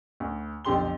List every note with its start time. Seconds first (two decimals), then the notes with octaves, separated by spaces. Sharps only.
0.20 D2
0.65 B1 F2 D3 G4 C6 G7